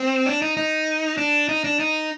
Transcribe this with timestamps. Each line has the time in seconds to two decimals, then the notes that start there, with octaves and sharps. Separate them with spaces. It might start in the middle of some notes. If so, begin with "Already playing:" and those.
Already playing: C4
0.26 D4
0.42 D#4
0.57 D#4
1.18 D4
1.49 D#4
1.64 D4
1.80 D#4